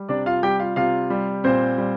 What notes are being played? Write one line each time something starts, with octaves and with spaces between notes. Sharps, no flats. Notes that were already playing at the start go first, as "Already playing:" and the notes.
Already playing: G3
C3 D4 D5
F4 F5
G3 G4 G5
F4 F5
C3 F4 F5
G3
A#2 C4 C5
G3